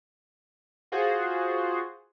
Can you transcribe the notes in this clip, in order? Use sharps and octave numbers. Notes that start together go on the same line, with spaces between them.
F4 F#4 G#4 C5